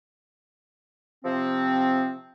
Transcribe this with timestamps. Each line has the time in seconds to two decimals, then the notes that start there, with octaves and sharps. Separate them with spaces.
1.24 C3 F3 C4